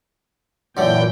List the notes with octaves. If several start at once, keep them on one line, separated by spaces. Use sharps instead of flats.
F#2 A#2 D3 E3 A3 G5